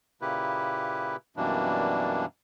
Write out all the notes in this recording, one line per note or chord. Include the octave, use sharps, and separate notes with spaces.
A#2 C#3 A#3 E4 G4 B4
F#2 B2 E3 G3 A#3 D4